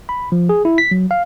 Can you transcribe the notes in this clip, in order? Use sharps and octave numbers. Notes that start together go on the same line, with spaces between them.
B5
F3
G#4
E4
B6
F#3
F5